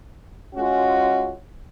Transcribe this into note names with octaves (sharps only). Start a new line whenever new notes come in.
G#3 C#4 F4 F#4